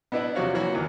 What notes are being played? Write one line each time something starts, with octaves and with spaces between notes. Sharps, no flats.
B3 D4 E4 B4 D5 D#5
E2 C3 F3 F#4 C#5 F5
E3 F3 A#3 E4 F#4 C#5
E2 D#3 E3 F#3